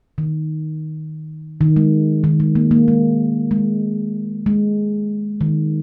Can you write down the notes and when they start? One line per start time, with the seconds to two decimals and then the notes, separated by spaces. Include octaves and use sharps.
0.18 D#3
1.61 D#3
1.76 G#3
2.24 D#3
2.40 G#3
2.55 A#3
2.71 A#3
2.88 G#3
3.51 G#3
4.46 G#3
5.41 D#3